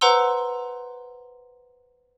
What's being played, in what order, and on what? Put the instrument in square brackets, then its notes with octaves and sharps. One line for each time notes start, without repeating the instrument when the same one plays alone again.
[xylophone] B4 C5 F#5 A#5 C6 E6